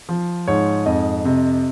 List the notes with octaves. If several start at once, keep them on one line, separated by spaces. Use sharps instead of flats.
F3
G#2 C#5
F2 D#5
C3